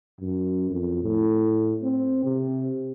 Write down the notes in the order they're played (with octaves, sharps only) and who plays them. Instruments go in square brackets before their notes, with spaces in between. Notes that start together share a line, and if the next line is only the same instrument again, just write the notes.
[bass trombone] F#2
F2
A2
C4
C3